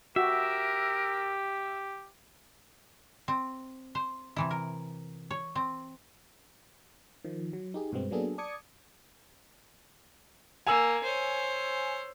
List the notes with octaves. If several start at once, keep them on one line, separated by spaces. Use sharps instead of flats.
F#4 G4 A#4 E5
C4
C5
C3 E3 E4
A#4
C#5
C4
D#3 F3
F#3
D#4 G4 G#4
G2 B2 G#3 B3 C4
F#3 A#3 B3 D4 G#4 A4
D5 A5 D6 D#6 G#6 C#7
A#3 G#5 E6
C5 C#5